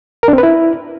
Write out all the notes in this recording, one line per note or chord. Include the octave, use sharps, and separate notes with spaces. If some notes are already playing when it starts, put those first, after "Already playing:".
A#4
D4
C4
B4
E4